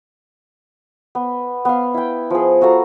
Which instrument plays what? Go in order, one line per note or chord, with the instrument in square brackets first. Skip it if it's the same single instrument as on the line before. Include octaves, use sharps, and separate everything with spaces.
[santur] B3
B3 F5
E4 G5
F3 G#4
F#4 A4 F5 A#5